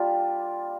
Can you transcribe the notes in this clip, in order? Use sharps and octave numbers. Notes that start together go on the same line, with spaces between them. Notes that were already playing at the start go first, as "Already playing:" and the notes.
Already playing: G3 A#3 D4 F4